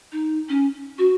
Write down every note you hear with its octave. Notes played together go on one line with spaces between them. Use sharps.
D#4
C#4
F#4